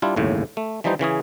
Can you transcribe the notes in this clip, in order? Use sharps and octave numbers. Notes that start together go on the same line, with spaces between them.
G3 D4 E4 F4
G1 D#2 A2 C#3
A3
E3 F3 G3 D#4 C5
C#3 E3 C#4 G#4